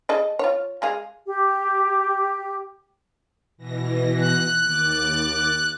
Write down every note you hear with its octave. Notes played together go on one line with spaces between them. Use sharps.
G#4 A4 D#5
F4 C#5
G#3 G#4 F5
G4
B2 E3 A#6
F#6
D#2 D6 A6